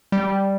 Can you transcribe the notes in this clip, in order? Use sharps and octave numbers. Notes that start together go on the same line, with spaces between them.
G3